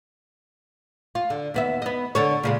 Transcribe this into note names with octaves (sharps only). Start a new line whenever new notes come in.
F4
D3
D#2 B3 E5
B3 D#5
D3 A4 C#5
A#2 C#3 G#3